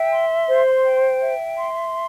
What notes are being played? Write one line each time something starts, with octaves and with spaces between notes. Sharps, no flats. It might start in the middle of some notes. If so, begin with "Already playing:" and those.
Already playing: E5 G5
C6
C5
G5
E5
C6